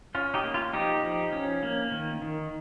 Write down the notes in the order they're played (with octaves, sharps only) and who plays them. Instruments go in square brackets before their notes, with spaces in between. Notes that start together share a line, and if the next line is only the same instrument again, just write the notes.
[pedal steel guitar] C#4 F4
D#4 G4
A#3
F4
F3 D#4 G4
F3
C#4
A#3
D#3
D#3